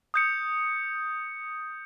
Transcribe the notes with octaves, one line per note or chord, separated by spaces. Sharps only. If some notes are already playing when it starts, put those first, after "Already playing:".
D#6 G6 C#7